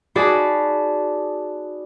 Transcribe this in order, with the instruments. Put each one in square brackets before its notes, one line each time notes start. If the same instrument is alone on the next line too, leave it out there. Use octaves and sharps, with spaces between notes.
[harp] D#4 F#4 G#4 D5 A5 B5